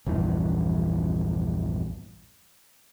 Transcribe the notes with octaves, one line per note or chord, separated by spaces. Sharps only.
A#1 E2 G2 E3